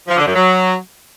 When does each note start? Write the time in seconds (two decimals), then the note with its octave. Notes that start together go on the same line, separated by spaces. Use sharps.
0.07 F3
0.17 D3
0.26 F#2
0.35 F#3